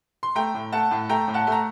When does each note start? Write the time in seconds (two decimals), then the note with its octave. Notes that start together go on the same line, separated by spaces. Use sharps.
0.23 C6
0.35 A3 G5 A#5
0.54 A2
0.72 A3 F#5 A5
0.91 A2
1.09 A3 G5 A#5
1.28 A2
1.34 F#5 A5
1.47 A3
1.52 A#5